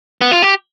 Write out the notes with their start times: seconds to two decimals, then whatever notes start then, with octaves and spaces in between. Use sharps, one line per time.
0.21 B3
0.32 F4
0.42 G4